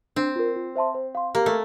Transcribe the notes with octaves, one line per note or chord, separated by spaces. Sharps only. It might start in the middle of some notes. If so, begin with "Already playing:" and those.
C4 D4
F4 A#4
F4
C5 E5 A5 C6
C5
F5 C6
A#3 G4
A3